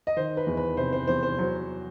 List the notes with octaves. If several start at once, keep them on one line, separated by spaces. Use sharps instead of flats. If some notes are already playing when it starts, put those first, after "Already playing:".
D#5
D#3 C5
B4
E2
B4
C3 C5
C5
E2 C5
C5
F#3